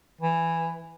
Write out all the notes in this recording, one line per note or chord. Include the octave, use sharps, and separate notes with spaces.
E3